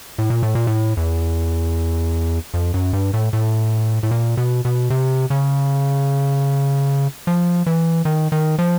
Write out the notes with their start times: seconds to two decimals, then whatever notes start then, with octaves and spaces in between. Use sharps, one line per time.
0.19 A2
0.30 A#2
0.43 A2
0.55 A#2
0.67 A2
0.97 E2
2.54 F2
2.74 F#2
2.93 G2
3.14 A2
3.33 A2
4.03 A2
4.11 A#2
4.37 B2
4.65 B2
4.90 C3
5.30 C#3
7.27 F3
7.67 E3
8.05 D#3
8.32 D#3
8.59 F3